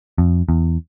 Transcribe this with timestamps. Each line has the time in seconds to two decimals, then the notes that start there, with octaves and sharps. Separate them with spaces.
0.18 F2
0.49 E2